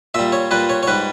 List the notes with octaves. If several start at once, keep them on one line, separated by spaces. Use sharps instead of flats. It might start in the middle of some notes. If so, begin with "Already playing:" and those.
A#2 G3 E5
C#5
A#2 G3 B4
C#5
C#5
G#2 G3 B4